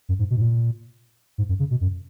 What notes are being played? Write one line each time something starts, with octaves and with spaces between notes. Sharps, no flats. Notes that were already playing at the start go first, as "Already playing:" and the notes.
F#2
G#2
B2
G#2
A#2
G#2
F#2
C#3
B2
F#2